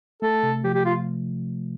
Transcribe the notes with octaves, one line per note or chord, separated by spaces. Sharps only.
A3 A4
C3
F3 G4
G4
F4